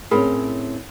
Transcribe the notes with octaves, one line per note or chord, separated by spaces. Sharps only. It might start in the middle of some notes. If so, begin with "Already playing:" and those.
A2 C4 C#4 G#4 A#4 B5